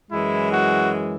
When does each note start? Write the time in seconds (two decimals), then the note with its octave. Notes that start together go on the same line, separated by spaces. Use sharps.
0.11 F#2 E3 G#3 E4
0.52 F#4